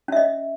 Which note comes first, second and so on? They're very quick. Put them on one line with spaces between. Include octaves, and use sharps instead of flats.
C#4 E5 D#5